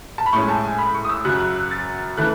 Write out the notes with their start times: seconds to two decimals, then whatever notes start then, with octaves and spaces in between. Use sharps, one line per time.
0.18 A5
0.26 B5
0.33 A2 G#3 C#4 C#6
0.43 G#5
0.48 A5
0.64 G#5
0.78 B5
0.94 C#6
1.05 D#6
1.09 E6
1.25 F#2 C#3 F#3 F#6
1.40 F#6
1.56 F#6
1.71 A6
2.17 C#3 E3 A3 F#6